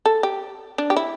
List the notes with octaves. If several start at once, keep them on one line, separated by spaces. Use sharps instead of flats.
A4
G4
D4
G4
E4